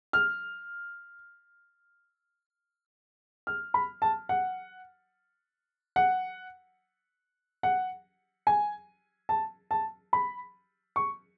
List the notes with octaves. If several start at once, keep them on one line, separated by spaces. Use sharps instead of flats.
F6
F6
B5
A5
F#5
F#5
F#5
G#5
A5
A5
B5
C#6